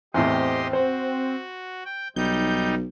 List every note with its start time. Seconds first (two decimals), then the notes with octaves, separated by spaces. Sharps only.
0.14 E2 A2 C4 G4 D#5 C6
0.73 F#4 C5
1.85 G5
2.16 B1 G3 D#4 G6